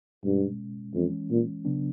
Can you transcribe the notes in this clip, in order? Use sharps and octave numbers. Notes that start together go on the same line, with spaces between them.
G2 B2 G#3 C#4
F2 E3 G#3 C#4
A#2
C#3 F#3 B3 D4